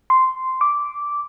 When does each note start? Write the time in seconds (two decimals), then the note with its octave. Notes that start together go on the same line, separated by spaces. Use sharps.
0.10 C6
0.61 D6